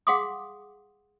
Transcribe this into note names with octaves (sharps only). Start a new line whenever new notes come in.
G#4 F5 F#5 C6 D6 D#6